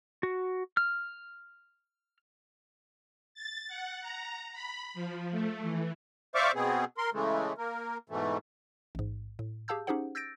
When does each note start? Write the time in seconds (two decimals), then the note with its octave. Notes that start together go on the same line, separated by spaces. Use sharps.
0.23 F#4
0.77 F6
3.34 A6
3.68 F#5
4.01 A#5
4.53 B5
4.94 F3
5.31 A3
5.61 E3
6.35 C5 D5 E5 F5 C#6 D6
6.55 B2 B3 C4 G#4
6.98 A#4 C6
7.13 C#3 E3 G#3 A3
7.58 A#3 A#4
8.09 G#2 B2 E3 A3
8.95 A1 G#2
9.39 A2
9.68 G4 G#4 F5 A5 E6 G6
9.87 C#4 D#4 G4 G#4 C5 F#5
10.15 E6 G6 A6 A#6 D7